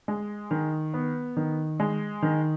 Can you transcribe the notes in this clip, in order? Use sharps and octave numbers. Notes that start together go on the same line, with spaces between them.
G#3
D#3
B3
D#3
G#3
D#3